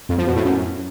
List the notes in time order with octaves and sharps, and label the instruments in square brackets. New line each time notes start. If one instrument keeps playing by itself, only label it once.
[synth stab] F2
F3
B2
A2
F#2